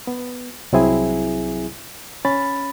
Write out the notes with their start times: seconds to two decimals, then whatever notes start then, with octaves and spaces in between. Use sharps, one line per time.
0.07 B3
0.73 C2 F#3 C4 E4 G#4 G#5
2.25 C#4 B5 A6